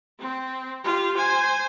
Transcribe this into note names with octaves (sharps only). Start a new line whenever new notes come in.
C4
F4 G4
C5 G#5